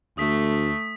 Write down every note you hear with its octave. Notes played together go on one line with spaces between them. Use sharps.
D2 A3 D#6 B6